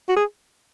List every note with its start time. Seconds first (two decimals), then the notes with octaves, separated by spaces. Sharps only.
0.09 F#4
0.16 G#4